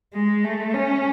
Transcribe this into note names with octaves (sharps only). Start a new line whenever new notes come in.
G#3
A3
C#4